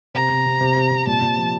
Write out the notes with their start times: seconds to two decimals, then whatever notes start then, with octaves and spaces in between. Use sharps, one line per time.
0.15 C3 A#5
0.30 C3
0.46 C3
0.61 C3
0.76 C3
0.92 C3
1.06 A#2 A5
1.21 A#2
1.37 F3